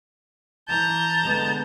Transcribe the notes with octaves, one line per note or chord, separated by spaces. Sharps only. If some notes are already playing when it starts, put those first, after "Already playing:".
E3 A5 A#5 G6
D3 G#3 B3